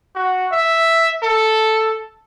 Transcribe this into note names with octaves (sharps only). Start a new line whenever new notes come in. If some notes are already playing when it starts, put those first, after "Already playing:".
F#4
E5
A4